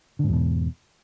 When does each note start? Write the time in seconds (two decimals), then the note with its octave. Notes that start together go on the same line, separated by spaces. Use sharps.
0.19 D3
0.24 G#2
0.28 E2
0.33 B2